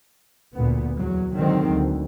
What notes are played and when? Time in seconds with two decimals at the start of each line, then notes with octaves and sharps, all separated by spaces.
0.55 D2 A#2 B3
0.96 E2 F#3
1.33 D3 D#3 F#3 G#3 C4
1.72 D2